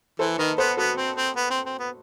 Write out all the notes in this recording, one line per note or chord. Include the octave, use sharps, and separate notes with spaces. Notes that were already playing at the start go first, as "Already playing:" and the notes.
E3 A4 C5
D#3 B4 D#5
B3 A4 C5
B3 F#4 A4
C4
C4
B3
C4
C4
B3